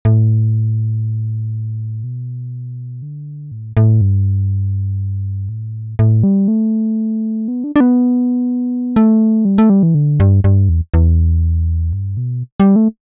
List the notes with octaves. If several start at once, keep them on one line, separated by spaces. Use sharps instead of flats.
A2
B2
D3
A2
A2
G2
A2
A2
G3
A3
B3
D4
D4
B3
A3
G3
A3
G3
E3
D3
G2
G2
E2
E2
G2
B2
G3
A3